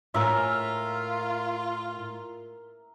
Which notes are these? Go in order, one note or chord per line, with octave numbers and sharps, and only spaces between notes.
A2 F4 A#4 E5